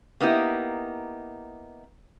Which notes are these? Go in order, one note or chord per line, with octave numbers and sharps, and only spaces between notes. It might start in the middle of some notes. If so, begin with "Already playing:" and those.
A#3 B3 D#4 E4 G4